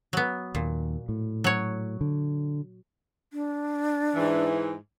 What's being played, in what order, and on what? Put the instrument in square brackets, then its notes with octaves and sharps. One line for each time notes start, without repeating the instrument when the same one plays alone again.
[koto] F#3 B3
[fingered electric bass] D#2 [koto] A#2
[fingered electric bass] A2
[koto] F#3 C#5
[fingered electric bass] D3
[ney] D4
[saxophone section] G#2 E3